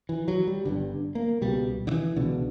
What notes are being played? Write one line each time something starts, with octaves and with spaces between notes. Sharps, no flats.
E3
F#3
G3
G1 G2 D3
A#3
C#2 B2 G3
D3
E3
C#2 B2 D3